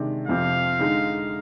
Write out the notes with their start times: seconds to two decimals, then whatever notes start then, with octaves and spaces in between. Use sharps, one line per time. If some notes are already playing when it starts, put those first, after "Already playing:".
Already playing: C3 D#3 G#3 D4
0.28 F2 C3 F3 C4 F5
0.79 D3 G#3 D#4